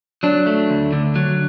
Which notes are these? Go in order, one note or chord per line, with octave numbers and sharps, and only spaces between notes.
F#3 D4
A3
D2
D3
F#3